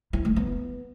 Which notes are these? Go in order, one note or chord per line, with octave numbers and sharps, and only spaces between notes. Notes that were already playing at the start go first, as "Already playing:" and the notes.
E4
A3
B3